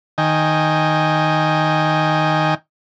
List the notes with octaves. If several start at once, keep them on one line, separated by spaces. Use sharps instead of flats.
D#3 D#5 G5 G#5